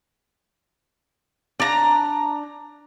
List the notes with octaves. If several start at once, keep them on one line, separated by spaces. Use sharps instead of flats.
D4 A#5